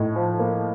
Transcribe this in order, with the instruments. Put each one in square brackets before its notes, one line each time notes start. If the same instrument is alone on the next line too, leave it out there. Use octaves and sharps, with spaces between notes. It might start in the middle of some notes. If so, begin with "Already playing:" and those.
Already playing: [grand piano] A2 D#4
F3
A#3